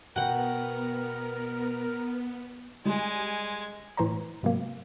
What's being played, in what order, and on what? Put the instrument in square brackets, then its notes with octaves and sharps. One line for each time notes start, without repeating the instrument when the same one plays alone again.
[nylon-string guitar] B2 G5 [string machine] B3 [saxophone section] A#4 [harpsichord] F#5
[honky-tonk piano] G3 [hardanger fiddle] G#3 G#5
[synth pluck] A2 E3 C5 C#5 A#5
G#2 C3 F#3 A#3